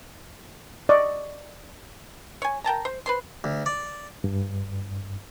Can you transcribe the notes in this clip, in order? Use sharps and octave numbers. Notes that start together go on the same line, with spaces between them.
D5 D#5 C#6
C#5 G#5
A#4 G5 A5 A#5
C5
B4 C5 C6
D2
D5
G2